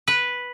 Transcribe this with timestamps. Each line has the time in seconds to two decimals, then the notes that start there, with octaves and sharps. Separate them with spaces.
0.08 B4